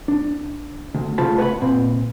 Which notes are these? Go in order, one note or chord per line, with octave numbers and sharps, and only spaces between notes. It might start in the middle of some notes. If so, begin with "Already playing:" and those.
D4
D2
C#3 A3 F4 C5 A5 B5
B4 F#5 G#5 B5
A#2 C4